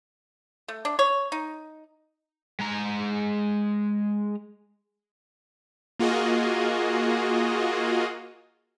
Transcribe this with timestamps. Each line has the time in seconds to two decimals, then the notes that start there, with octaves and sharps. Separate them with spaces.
0.68 A3
0.85 D4
0.99 C#5
1.32 D#4
2.60 G#3 A#5
5.99 A#3 F4 F#4 G#4 D#5